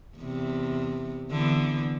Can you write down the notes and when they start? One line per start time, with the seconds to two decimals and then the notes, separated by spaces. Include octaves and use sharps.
0.18 E2 C3
1.31 D3 E3 B3